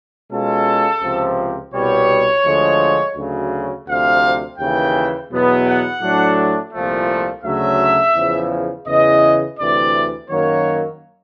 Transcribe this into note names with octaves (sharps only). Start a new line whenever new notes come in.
B2 G#3 C#4 F4 A4
C#2 C3 F3
C2 B2 G3 B3 C#5
D2 D3 F3 G#3
D2 C#3 F#3
D2 C3 F3 F5
D#2 C#3 E3 G5
E2 B2 F#3 B3
F#5
A2 F#3 A3 D4
C2 A#2 F3 A3
D2 C#3 F#3 A3 E5
E2 C#3 F3
E2 C#3 E3 D#5
D2 C3 E3 D5
F#2 D#3 F#3 A#3 C#5